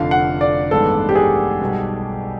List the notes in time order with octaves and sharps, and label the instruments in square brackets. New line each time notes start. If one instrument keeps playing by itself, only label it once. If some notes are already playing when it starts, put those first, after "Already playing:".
Already playing: [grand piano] F1 F2 D3 [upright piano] F5
[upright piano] F#5
D5
[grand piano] A1 G2 D#3 G#3 B3 [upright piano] A4
[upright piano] G4
G#4
[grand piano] B1 B2 G3